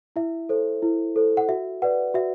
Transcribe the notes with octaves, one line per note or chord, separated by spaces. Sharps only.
E4 E5
A4 C5
E4
A4 C5
F#5
F#4 E5
B4 D5 F#5
F#4 E5